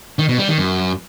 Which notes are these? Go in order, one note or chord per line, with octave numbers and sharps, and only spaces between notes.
D#3
B2
G3
D#3
F#2